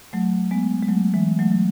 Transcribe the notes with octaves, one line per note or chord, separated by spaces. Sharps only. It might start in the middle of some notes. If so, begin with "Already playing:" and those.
F#3 A3
G#3 B3
G#3
F#3 A3
E3 G#3
F#3 A3
F#3